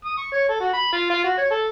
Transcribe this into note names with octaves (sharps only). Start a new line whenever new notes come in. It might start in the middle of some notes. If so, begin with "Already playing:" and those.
D#6
C#6
C#5
A4
F#4
B5
F4
F4
F#4
C#5
A4